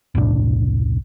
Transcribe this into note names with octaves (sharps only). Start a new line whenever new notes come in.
E1 C2 A2 D4